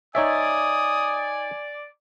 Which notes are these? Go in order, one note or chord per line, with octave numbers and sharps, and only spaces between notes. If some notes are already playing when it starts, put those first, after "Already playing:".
D#4 C#5 D5 E5 G#5 D#6